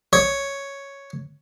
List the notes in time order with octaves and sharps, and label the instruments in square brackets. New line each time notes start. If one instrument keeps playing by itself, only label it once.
[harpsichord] C#5